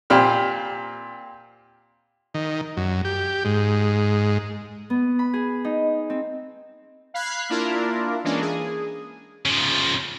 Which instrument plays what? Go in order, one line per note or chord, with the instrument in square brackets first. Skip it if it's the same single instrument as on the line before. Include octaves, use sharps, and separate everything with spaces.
[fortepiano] A#2 C4 G4 B5 F6
[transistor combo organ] D#3
F#2
G4
G#2
[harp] B3
B5
G#4
D#4
C4
[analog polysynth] F5 B5 F#6 G#6 C7
A#3 D4 E4 F4 A#4
E3 G#3 A#3 C#4 D4
G#4
[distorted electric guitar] C#3 F3